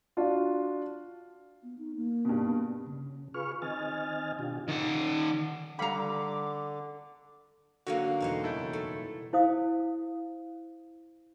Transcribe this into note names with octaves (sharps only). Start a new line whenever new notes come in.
D4 F4 F#4 D5
B3
D#4
A#3
G2 B2
C#3
F4 G#4 B4 C#6 F6
D#3 C4 D#5 G#5 F6 A6
B2 D4 F4 G4
D#3 F#5
D3 G3 F5 F#5 A#5 B5 D6
D3 F#3 A#3 F#4 F5
E2 B2 G3 D#4 C5 C#5
F#1 E4 A4 G6 D7
A3
E4 C5 F5 D#6